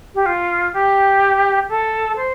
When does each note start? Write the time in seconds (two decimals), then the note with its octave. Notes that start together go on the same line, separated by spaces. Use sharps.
0.15 G4
0.26 F4
0.73 G4
1.69 A4
2.17 C5